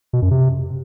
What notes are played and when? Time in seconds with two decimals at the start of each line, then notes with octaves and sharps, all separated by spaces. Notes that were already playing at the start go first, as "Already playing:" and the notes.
0.13 B2
0.22 F#2
0.31 C3